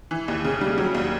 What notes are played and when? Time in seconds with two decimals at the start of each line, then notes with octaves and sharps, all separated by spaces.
0.11 E3
0.28 D#2
0.44 C#3
0.61 G3
0.78 F#3
0.95 D#2